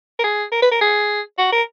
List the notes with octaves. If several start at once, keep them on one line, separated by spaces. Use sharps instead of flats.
A#4
G#4
A#4
B4
A#4
G#4
F#4
A#4